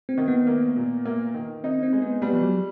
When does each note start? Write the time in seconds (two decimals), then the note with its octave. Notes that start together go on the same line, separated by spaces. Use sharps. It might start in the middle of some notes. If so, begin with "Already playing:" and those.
0.09 C4
0.17 D#3
0.28 B3
0.47 A#3
0.76 A#2
1.05 A#3
1.34 D#3
1.64 C4 D#4
1.83 C4
1.92 G#3
2.02 B3
2.22 G3 B3
2.33 F3
2.42 F#3